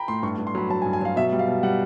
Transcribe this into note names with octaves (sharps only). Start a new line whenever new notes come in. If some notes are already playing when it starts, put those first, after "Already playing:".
Already playing: G5 A#5 B5
A2 C6
G2 C#6
G2
C6
F#3 B5
F#3 A5
G#5
G2
G#5
F#3 F5
B2 E5
G3
F5
B2
G3 F#5